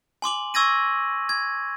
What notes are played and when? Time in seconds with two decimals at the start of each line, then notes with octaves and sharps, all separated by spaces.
0.22 G#5 C6 D6 F#7
0.54 C#6 E6 G#6 A#6 D#7
1.29 G#6